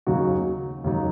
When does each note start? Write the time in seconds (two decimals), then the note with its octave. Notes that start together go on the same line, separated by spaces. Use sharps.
0.07 D#2 C#3 F#3 D#4 F#4
0.84 D#2 C#3 F#3 D#4 F#4